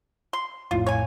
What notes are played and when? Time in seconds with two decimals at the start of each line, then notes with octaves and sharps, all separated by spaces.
0.33 C6
0.71 A#1 F2 A2 F4
0.86 C#5 G#5